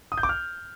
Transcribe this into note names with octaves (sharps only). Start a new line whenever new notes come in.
D#6
G6
D6
F6